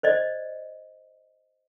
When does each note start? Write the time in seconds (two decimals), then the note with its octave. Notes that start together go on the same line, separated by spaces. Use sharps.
0.03 C5 D5 D#5